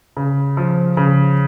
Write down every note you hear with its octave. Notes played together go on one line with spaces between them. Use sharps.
C#3
F3
C#3